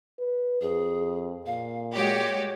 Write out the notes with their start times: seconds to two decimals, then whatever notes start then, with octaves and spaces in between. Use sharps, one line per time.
0.19 B4
0.62 F2 G#4
1.46 A#2 F5
1.95 G#3 F#4 G4 C#5